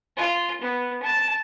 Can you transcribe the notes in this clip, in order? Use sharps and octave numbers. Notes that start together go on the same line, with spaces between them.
F4
B3
A5